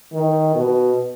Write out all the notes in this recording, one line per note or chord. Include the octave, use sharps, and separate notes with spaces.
D#3
B2